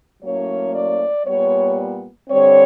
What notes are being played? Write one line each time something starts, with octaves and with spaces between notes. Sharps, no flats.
A2 F#3 A#3 C#4 C#5
D5
A#2 G3 B3 C#5
D3 G3 C4 C#5